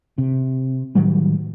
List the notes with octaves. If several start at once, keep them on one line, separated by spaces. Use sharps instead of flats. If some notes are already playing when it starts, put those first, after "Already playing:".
C3
A2 D#3 F#3 G3